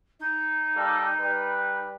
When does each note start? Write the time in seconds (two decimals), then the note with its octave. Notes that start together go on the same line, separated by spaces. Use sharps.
0.19 D#4
0.76 G3 A#3 A4
1.20 G3 B4